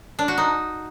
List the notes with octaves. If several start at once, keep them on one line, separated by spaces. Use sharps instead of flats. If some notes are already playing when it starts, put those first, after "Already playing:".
D4
F#4
D#4